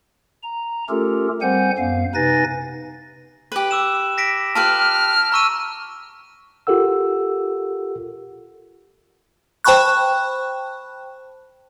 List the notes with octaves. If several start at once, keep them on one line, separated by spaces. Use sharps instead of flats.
A#5
A3 C#4 F4 G4 A4 A#4
G3 C4 C5 F#5 G#5 G6
F#2 B3 F5
C3 D#4 B4 G#5 A6 A#6
G4 B4
D6 E6 E7
A#6 B6 D7
F4 G4 B4 A5 F6
A#5 C#6 E6 D#7
F4 G4 A4 A#4 F#5 E6
C5 G5 A5 B5 C#6 F#6